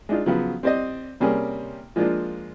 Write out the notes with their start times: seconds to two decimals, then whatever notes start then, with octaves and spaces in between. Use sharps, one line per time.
0.09 G#3 D4 D#4 F4
0.26 C#3 F3 F#3 B3
0.63 C4 G4 C5 D5 D#5
1.20 C3 G3 A#3 C#4 G#4
1.96 F3 G#3 A#3 D4 F4